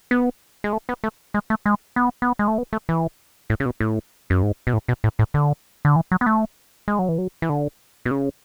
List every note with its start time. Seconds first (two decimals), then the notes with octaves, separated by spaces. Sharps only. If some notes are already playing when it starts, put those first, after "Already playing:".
0.11 B3
0.64 G#3
0.73 A3
0.89 B3
1.04 A3
1.34 G#3
1.50 A3
1.66 G#3
1.96 B3
2.22 B3
2.39 G#3
2.48 A3
2.58 B3
2.73 A3
2.89 E3
3.50 A2
3.60 C#3
3.66 B2
3.80 A2
4.30 F#2
4.43 G#2
4.67 B2
4.73 A2
4.88 B2
5.04 A2
5.19 A2
5.34 D3
5.85 D3
5.96 E3
6.11 F#3
6.21 B3
6.26 A3
6.88 G#3
6.99 F#3
7.09 E3
7.18 F#3
7.42 E3
7.49 D3
8.05 B2
8.11 C#3